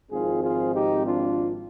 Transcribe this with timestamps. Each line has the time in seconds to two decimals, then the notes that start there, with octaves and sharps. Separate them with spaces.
0.11 G#1 G#2 F3 C4 F4 G#4
0.43 F4 G#4
0.74 D#4 G4
1.06 D4 F4